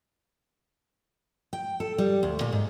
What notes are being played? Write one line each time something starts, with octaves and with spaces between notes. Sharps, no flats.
G5
A4
G3
D2
A#2
G#2